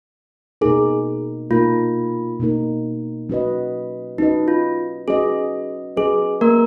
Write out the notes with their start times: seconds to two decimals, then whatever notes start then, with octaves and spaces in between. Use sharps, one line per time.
0.61 B2 A#3 D#4 G#4 A#4
1.50 B2 A#3 D#4 F4 A#4
2.40 B2 A#3 D#4 A#4
3.29 F#3 C#4 F#4 B4 D#5
4.18 F#3 C#4 D#4 F#4 B4 D#5
4.48 F4
5.08 F#3 C#4 F#4 G#4 B4 D#5
5.97 F#3 C#4 F#4 G#4 B4 D#5
6.41 A#3 A#4